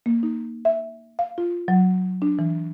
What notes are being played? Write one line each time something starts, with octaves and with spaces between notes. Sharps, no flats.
A#3
D#4
E5
F5
F4
F#3
D4
E3